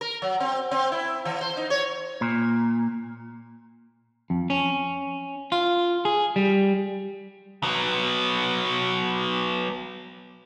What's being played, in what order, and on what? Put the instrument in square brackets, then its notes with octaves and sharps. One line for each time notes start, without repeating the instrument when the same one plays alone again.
[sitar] A#4
F#3
C4
C4
E4
E3
C5
D#4
C#5
[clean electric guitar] A#2
F2
C#4
F4
G#4
G3
[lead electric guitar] F#3 B3